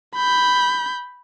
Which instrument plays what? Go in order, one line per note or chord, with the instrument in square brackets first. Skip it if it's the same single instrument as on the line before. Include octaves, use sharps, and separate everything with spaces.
[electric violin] B5 G6